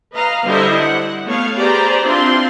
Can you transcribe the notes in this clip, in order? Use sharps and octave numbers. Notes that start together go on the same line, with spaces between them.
B4 D#5 F5 A#5
D3 G3 E4 C5 D#5 E5
F#5
A3 B3 C#5 F5
G4 G#4 B4 C5 D5 A#5
C4 D4 E4 F4 C6